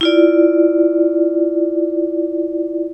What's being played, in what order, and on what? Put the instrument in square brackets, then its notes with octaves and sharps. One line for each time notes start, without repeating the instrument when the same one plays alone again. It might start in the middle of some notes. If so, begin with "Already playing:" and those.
[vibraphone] E4 F4 D5